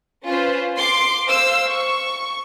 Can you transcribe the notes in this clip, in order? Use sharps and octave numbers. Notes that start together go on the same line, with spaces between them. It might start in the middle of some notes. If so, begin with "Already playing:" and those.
C#4 F4 B4 C5
C6 D6
C5 F5 E6
C#6